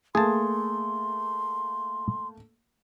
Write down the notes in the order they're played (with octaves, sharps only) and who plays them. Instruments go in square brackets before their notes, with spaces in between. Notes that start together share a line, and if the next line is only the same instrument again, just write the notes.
[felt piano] A3 A#3 [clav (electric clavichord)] G#4 A5 [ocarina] C6